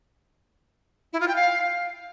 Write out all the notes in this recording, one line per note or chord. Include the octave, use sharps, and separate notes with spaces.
E4
F4
G5
F5